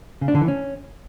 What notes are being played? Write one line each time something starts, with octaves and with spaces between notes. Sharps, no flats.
C#3
D4
D3
E3
C#4